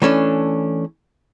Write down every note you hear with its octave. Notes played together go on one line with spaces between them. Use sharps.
E3 A3 C#4 D4